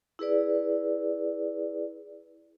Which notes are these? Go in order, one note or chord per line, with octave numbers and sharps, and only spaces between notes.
E4 G#4 B4 D5